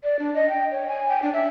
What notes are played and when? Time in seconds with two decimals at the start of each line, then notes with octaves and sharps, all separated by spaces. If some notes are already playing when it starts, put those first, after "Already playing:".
0.04 D5
0.19 D4
0.34 D#5
0.49 G5
0.71 C#5
0.88 G#5
1.09 G5
1.22 D4
1.34 E5